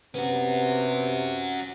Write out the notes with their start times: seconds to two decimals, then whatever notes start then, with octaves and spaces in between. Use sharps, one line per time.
0.15 C3 B3 C#4 F#4